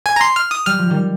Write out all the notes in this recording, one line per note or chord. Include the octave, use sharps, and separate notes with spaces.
G#5
A#5
C6
F6
D#6
G3 F6
F3
D#3 G3